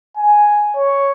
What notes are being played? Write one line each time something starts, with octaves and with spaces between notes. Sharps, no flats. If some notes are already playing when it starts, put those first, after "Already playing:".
G#5
C#5